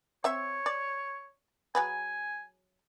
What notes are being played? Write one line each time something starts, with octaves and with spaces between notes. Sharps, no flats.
C4 C#5 E5
D5
F#3 G#4 B4 G#5